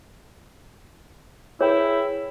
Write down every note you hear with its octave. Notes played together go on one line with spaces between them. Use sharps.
E4 G#4 B4 C#5 G5